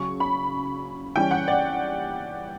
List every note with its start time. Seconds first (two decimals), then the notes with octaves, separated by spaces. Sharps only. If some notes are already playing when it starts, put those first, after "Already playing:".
Already playing: C#3 F#3 C#4 C#6
0.20 B5
1.16 E3 G3 C#4 G5
1.31 F#5
1.48 D5